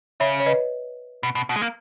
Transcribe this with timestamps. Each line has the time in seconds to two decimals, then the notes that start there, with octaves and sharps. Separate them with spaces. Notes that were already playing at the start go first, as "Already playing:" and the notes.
0.20 C#3 C#5 E5
0.40 C#5
0.46 B4 D#5
1.23 B2
1.35 B2
1.49 B2
1.56 G#3
1.61 A#3